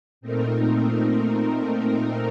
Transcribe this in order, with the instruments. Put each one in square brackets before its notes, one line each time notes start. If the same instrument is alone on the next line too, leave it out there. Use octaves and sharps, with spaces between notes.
[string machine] A#2 A3 C4 D#4 A#4